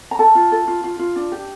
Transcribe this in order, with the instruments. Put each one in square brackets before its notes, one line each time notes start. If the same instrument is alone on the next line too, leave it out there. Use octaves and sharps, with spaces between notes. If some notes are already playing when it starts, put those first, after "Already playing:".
[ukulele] A#5
A4 A5
F4
A4
F4
F4
F4
D4
G4